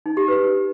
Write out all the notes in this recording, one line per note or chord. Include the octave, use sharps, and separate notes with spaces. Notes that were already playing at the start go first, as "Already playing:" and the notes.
D#4
G4
B4